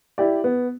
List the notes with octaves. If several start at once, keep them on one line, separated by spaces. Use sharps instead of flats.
E4 G4 D5
B3